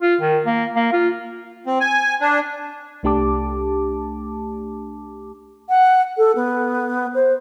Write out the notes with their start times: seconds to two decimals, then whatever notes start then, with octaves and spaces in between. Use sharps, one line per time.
0.01 F4
0.21 D#3
0.46 A#3
0.76 A#3
0.93 F4
1.66 C4
1.80 G#5
2.21 D4
3.03 C2 A3 D4 G4 A5 D6
5.69 F#5
6.17 A4
6.35 B3
7.14 C5